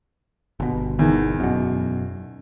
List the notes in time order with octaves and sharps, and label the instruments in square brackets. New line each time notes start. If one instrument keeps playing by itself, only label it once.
[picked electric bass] G1 B2
[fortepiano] E2 D#3
[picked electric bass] F#2 B2